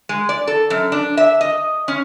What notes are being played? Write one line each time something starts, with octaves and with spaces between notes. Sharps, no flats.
G#3
D5
A4
F#2
D4
E5
D#5
C#4